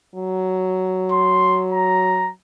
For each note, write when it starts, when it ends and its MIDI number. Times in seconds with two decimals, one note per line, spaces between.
0.15 2.31 54
1.12 1.63 84
1.72 2.30 82